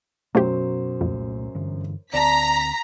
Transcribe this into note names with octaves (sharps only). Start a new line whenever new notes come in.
F#2 B2 F#3 A3 F4 G4 C5
C2 F2 A#2 A3
G2 D3 E3
D2 C4 D5 A5 A#5 B6